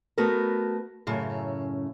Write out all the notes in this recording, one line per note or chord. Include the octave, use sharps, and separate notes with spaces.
A3 B3 F#4 A#4
F#2 A2 C#3